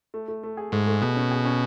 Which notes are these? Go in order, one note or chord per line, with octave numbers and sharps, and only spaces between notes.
A3
A3
A3
G#4
G#2 A3
A3
B2 G#4
C#4
G#4
C#4